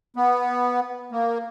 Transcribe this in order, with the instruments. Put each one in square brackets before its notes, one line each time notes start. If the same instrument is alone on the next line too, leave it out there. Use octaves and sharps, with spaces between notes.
[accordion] B3
A#3